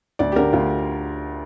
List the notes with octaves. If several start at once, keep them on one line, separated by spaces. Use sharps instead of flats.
D2 D5
G4
D3 A#4
D2 F4